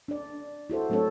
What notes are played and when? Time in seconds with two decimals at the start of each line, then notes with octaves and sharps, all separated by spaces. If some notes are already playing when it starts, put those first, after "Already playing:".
0.08 D4 D5
0.70 E4 F#4 A4 C5
0.90 F#3 A3 C4 D4 A4 C#5